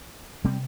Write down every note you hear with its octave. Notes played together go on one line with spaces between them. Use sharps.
C3 G3 C4